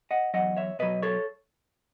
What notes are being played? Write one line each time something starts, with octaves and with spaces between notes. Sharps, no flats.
D#5 F#5
E2 B2 F#3 D#5 F#5
C#5 E5
B2 F#3 B4 D#5
A4 C#5